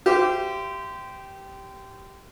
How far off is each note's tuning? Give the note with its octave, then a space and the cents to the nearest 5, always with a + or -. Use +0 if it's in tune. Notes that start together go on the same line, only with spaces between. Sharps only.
G4 -10 C5 -25 E5 +40